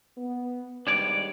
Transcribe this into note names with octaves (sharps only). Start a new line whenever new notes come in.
B3
D#2 G#2 G3 D4 C#5 D5